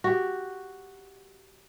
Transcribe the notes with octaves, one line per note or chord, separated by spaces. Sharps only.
F#4 G4